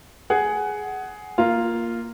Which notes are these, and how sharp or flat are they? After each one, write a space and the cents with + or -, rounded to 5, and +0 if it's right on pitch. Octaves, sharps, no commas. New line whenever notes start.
G#4 +10 F#5 +15
A#3 +0 F4 -5